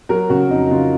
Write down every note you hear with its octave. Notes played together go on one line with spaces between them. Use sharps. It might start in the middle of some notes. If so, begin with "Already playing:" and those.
F#3 A#4
C#3 F#4
F2 D#4
C#3 F4